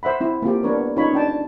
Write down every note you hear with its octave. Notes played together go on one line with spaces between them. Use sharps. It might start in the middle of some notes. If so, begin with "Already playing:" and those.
C5 E5 F#5 B5
C4 E4
A#3 C4 F4 G4
B3 D4 A#4 B4 C#5
C#4 D#4 F4 F#4 C#5 B5
C#4 D4 G5 A5